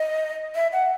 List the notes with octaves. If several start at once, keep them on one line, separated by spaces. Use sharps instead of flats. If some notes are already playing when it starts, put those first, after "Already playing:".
Already playing: D#5
E5
F#5